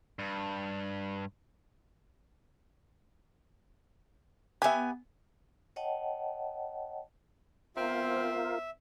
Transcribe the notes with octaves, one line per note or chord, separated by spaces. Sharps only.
G2
B3 G4 E5 G#5
C#5 D#5 F#5 G5 A5
B3 C4 F4 A#4 C5 E5 F5